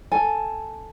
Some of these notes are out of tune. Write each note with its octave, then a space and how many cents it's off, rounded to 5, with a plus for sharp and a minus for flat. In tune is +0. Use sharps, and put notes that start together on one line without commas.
A4 +0 G#5 +0